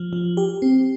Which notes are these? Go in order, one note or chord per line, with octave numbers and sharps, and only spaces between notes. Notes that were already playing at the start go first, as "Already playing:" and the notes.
Already playing: F3
F3
G4
C4